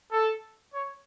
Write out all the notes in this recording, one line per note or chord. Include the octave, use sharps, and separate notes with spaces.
A4
C#5